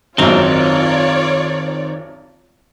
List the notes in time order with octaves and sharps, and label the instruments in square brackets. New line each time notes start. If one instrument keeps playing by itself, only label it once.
[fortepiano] G#1 F#2 [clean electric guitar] D#3 C4 D#4 [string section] F4 C#5 D5